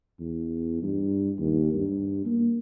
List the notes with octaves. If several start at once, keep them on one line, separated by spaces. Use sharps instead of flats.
E2
G2
D#2
G2
A#3